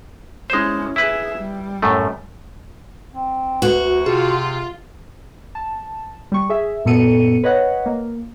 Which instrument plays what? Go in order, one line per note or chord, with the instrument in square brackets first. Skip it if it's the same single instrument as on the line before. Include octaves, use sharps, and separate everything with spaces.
[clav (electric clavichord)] G#3 C5 [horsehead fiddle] C#4 E4
[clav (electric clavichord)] E4 B4 [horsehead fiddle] G#4 E5
[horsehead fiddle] G3
[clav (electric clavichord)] F#2 A2 A3
[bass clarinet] C4
[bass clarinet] D2 [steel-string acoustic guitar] F#4 [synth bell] B4
[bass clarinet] C3 [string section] F4 [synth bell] G#4
[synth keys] A5
G3 C#6
G#4 E5
F#2 A#2 B3 A4 C#7 D#7
B4 C#5 D#5 F#5
A#3